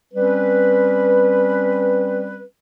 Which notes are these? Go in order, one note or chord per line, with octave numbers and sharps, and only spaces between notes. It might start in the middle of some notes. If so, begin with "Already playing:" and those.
G3 C4 C#4 B4